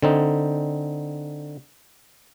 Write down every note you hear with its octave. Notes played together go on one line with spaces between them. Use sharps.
D3 C4 D#4